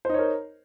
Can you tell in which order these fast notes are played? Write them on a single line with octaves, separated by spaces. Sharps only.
C5 D#4 C#5 A#4